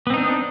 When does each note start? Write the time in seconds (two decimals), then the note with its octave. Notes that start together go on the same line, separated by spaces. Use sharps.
0.07 B3
0.10 C4
0.14 D#4
0.17 D4